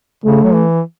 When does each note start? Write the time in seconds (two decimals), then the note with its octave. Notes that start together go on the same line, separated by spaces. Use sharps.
0.24 C#3 A3
0.43 F#3
0.54 E3